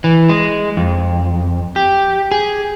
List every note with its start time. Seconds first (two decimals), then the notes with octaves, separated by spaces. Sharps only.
0.04 E3
0.29 G#3
0.77 F2
1.76 G4
2.31 G#4